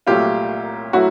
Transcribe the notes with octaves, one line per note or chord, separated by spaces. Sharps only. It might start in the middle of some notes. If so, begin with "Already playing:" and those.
C2 A#2 F#3 A3 F4 G4
F#3 A3 E4 F#4